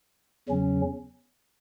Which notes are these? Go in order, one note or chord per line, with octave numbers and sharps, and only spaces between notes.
E2 C#3 F#3 C#4